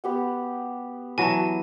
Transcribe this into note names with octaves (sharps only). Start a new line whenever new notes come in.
B3 G4 F#5
E3 F#3 G#5 A5